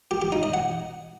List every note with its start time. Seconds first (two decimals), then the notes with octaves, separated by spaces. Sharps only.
0.11 G4
0.22 G4
0.32 D#4
0.43 D#5
0.54 F#5